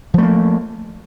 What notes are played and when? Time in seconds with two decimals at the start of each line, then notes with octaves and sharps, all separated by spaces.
0.14 F3
0.18 A3
0.23 A#3